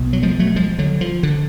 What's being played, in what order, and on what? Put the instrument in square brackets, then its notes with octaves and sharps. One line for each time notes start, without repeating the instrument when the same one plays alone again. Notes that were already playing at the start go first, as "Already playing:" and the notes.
Already playing: [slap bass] B1 B2
F#3
F3 G#3
F#3 A3
F3 G#3
D3 F#3
F3
D3